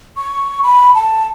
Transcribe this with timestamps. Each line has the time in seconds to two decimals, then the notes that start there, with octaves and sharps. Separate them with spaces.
0.17 C#6
0.63 B5
0.95 A5